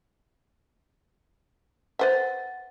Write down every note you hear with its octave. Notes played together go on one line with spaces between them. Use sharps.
B4 C5 E5 F#5 A6